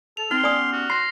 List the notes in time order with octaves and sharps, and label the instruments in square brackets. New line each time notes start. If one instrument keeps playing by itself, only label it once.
[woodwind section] A4 [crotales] F7
[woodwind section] C4 [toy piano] D#4 [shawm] C6 [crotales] F6
[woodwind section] B3 C#4 G4 [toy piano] D5 G#5 D#6
[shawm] F#4
[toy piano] C6 [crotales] A#6 C7